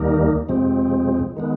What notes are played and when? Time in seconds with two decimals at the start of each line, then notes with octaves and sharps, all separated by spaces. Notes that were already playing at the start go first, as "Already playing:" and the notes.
Already playing: D#2 D#3 G3 A#3 D#4
0.48 F2 C3 F3 G#3 C4
1.37 D#3 G#3 B3